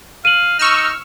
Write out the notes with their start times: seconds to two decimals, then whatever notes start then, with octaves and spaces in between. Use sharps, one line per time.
0.25 F5 D#7 F#7
0.59 D#4 C#6 E6 F6